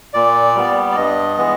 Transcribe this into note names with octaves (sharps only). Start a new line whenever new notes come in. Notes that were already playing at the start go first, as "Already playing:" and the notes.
A#2 D5
G3 B3
D5
G2 D#5
E3 G#3 B3